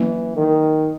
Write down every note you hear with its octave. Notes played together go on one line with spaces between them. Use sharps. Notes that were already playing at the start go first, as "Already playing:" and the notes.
Already playing: E3 F#3 A#3 C#4
D#3